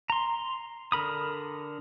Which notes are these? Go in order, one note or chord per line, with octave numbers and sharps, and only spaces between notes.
A#5 C6
D3 A#4 B5 D#6